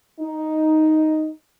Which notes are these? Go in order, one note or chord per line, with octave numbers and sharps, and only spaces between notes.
D#4